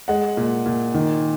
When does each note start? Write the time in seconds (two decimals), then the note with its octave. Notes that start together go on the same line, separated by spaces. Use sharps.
0.08 G#3 F#5
0.37 A#2
0.66 A#2
0.94 D#3